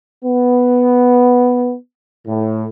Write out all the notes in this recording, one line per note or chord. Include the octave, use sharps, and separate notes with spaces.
B3
A2